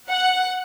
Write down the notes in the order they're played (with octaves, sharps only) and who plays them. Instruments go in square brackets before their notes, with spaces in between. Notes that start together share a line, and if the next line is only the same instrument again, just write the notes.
[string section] F#5